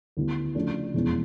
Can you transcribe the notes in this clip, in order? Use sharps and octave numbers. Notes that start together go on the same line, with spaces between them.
D2 D3 G3 B3 E4
C#3 F3 A3 D4
F1 E2 B2 G#3 C#4